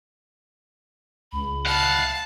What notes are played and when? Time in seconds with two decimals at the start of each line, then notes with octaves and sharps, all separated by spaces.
1.32 C#2 B5
1.66 F5 F#5 A5